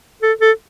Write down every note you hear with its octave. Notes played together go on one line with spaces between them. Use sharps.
A4
A4